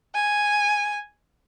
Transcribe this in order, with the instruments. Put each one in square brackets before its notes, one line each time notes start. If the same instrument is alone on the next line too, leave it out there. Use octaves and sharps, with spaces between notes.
[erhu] G#5